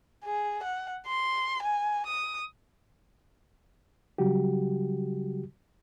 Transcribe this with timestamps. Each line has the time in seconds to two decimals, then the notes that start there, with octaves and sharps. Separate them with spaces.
0.24 G#4
0.63 F#5
1.07 C6
1.62 G#5
2.06 D#6
4.18 C#3 F#3 G3 F#4 G4